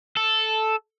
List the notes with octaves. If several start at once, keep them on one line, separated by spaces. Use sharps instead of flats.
A4